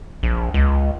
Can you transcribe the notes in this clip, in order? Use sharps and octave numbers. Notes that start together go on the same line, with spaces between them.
A#1
C#2